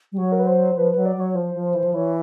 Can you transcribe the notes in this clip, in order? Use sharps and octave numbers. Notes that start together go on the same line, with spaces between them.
G3
F#3 C#5
A#4
B4
C5
F3 B4
F#3 B4
D5
F#3 C#5
F3 C5
F3
C5
E3
F3
E3 C#5